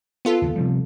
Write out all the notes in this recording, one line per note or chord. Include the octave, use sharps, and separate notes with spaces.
B3 F4 A4
D#2 C#3
C3 F3 G3